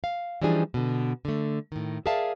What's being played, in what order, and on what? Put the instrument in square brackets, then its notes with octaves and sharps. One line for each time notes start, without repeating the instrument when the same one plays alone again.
[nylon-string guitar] F5
E3 F3 G3 D4 D#4 G#4
B2 D3
D3 A3
A2 D#3
G#4 A#4 D5 E5 F5 A5